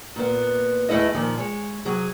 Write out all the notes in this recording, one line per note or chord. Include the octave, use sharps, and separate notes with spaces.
A#2 B3
E2 A3 E4 A4 D#5
A#2 D#3 F3
G#3 C#5
C3 F#3 G#4